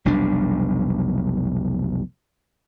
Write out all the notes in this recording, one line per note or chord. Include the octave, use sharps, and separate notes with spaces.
F1 B1 G3 D4